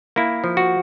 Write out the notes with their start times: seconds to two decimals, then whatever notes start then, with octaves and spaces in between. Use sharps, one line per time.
0.16 A#3 E4
0.44 F3
0.57 F#4